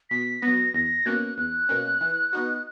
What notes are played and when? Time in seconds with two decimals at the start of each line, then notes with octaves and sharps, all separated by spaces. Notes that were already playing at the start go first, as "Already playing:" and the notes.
0.10 B2 B6
0.42 F#3 B3 A#6
0.74 E2 A#6
1.06 B2 A#3 C#4 F#6
1.38 E2 F#6
1.69 B2 A#3 C#4
2.01 E3
2.33 B3 D#4 F#4